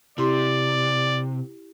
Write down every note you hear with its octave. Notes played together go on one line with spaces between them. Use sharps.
C3 E4 G4 D5 C6